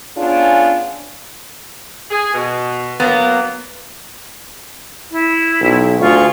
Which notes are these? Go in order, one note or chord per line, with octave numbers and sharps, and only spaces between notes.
B3 C#4 D4 F4 G#4
G#4
B2
F#3 A#3 B3
E4
B1
D2 F4 G#4 C#6